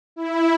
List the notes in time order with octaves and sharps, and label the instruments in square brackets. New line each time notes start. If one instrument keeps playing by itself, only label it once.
[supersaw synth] E4